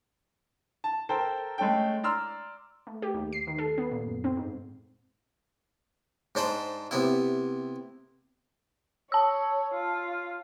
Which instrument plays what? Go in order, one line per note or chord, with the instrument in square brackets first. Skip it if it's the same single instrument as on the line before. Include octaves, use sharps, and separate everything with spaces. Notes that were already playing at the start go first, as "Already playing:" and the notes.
[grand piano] A5
A4 A#4 C5 G5
G#3 A3 C#4 A4 G5
D5 A#5 C6 E6 F6
[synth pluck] A3
G4
D#2
C7
D#3
A4
B3
A#2
F#2
C4
G#2
[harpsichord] G#2 D4 C5 B5
C3 B3 E4
[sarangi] C#5 [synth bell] A5 E6
[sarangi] F4